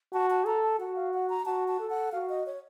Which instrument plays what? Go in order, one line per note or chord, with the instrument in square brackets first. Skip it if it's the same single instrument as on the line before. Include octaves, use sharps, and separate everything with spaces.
[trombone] F#4 [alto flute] A5
[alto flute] A5
[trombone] A4 [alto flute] A#5
[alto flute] A5
[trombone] F#4 [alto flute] F#5
[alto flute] F5
F#5
A#5
[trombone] F#4 [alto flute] A5
[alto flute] A5
[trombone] A4
[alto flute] F#5
[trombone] F#4 [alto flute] F5
[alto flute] D#5
C#5